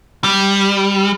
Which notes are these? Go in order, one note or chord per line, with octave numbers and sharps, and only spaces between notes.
G3